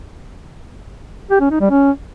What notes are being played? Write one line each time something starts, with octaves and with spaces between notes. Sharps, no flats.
G4
C#4
D#4
G3
C#4